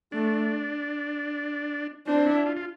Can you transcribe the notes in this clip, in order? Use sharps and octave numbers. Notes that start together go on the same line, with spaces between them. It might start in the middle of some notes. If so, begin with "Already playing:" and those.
A3 D4
C4 D4
E4
F4
F4